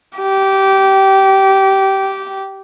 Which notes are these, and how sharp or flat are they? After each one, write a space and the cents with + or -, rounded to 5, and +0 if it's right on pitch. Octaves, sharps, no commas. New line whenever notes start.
G4 -20